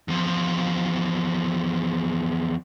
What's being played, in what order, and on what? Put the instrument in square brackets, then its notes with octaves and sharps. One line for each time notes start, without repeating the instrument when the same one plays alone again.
[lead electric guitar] E2 F3